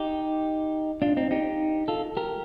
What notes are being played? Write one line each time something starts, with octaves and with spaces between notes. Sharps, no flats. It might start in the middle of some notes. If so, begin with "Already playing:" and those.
Already playing: D#4 G4
D4 F4
C4 D#4
D#4 G4
F4 A4
G4 A#4